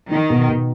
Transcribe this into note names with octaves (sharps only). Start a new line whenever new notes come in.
D#3 D#4
B2
B2